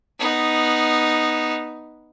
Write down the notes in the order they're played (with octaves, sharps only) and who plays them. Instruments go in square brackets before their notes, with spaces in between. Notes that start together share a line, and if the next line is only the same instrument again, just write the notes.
[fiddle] B3 D#4